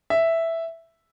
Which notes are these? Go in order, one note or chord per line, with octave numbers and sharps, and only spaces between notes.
E5